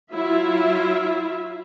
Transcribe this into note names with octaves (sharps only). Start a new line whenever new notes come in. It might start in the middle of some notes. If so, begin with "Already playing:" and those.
F#3 E4 F4 E5